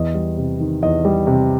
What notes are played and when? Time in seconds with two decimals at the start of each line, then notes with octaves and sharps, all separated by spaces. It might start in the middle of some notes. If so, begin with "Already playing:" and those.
Already playing: E2 D#5
0.15 G3
0.37 C3
0.60 D#3
0.82 E2 D#5
1.05 G3
1.27 C3